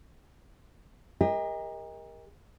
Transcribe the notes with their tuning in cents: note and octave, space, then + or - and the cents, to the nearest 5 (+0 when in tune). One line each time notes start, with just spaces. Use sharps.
G4 +45 A#4 +10 D#5 +20